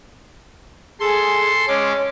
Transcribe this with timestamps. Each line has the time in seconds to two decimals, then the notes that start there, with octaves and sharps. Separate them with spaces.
1.00 G#4 A4 C6
1.68 G#3 C#4 C#5 D6